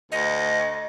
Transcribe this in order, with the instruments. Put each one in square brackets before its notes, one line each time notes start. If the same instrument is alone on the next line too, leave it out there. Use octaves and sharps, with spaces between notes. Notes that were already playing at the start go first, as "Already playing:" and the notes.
[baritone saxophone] D2 [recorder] D#5